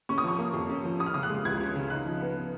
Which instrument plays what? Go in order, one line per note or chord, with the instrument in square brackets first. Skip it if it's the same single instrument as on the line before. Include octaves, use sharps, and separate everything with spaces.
[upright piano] C#4 C#6
D#6
F3 C#6
A#3
F2
C#4
F3
C#4 D#6
F6
C#3 D#6
F#6
G#3
C#2 G#6
C#4
C#3
D#4 F#6
F3
B3